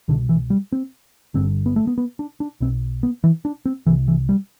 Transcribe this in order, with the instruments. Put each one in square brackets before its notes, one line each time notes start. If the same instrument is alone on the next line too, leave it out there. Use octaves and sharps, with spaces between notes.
[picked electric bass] C2 B2 D3
E3
G3
C4
G1 G2 D3 C4
B3
A3
B3
B3
D4
D4
B1 B2 C4
B3
E3
D4
C4
C2 C3 E3
E3
G3